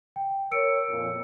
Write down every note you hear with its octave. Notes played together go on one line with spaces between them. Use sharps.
G5
A#4 C#5 E6 C#7 D7
F2 A#2